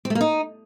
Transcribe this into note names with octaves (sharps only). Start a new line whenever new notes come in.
C4
A3
A#3
D#4